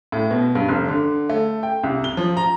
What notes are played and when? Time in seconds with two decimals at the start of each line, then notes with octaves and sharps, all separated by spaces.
0.12 A2
0.31 B2
0.55 G2
0.69 F1
0.88 D3
1.29 A3
1.63 G5
1.83 C2
2.04 G7
2.17 F3
2.37 A#5